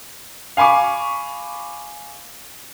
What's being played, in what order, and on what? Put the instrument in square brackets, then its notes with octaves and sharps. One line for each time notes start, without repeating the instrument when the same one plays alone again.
[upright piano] F5 G#5 B5 C#6 D6